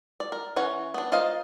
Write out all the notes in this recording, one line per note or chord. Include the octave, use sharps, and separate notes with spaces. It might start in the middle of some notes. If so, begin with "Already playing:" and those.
D5
A#4
E3 C#4 C#5 F#5
B3 D4
F4 A#4 C5 D#5 F5